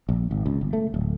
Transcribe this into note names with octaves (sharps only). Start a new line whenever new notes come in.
A#1
G#1
C#2
G1
A3
D1